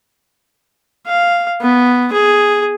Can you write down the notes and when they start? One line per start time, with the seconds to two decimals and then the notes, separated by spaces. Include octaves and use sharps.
1.07 F5
1.61 B3
2.13 G#4